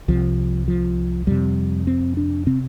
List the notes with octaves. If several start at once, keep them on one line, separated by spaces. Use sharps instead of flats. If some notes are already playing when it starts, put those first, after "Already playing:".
C2 C3 F3
F3
F2 C3 G3
C4
D4
C3 C4